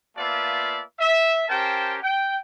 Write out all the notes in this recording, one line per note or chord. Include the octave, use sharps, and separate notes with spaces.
A#3 B3 F4 D5 E5 A5
E5
C#4 G4 A#4 C5 G5 A5
G5